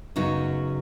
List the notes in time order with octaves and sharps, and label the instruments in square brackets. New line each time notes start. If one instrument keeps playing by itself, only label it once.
[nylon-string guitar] F#2 C#3 F#3 B3 D#4